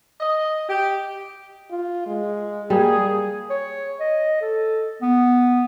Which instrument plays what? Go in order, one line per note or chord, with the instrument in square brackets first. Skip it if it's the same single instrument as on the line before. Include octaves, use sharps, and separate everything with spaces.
[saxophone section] D#5
G4
[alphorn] F4
G#3
[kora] G3 [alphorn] A#3 [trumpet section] G#4
[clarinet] C#5
D#5
A4
B3